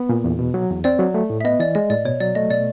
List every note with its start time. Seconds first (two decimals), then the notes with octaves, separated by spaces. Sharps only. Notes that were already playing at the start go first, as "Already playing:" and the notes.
Already playing: B3
0.09 A#2
0.24 E2
0.39 B2
0.54 F#3
0.70 E2
0.84 C4 D5
0.99 F#3
1.14 A3
1.30 A2
1.41 E5
1.44 B3 D#5
1.60 E3 D5
1.75 G#3 D#5
1.90 A2 D5
2.05 B2 C#5
2.20 F#3 D5
2.35 A3 D#5
2.50 B2 D5